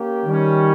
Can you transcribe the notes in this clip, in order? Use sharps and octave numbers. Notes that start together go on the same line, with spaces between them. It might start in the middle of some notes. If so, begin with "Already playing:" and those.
Already playing: A#3 C#4 G4
D#3 G3 C#4